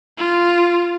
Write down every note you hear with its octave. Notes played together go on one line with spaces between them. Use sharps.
F4